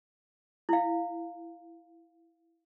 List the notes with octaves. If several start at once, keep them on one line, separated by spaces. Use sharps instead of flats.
E4 F5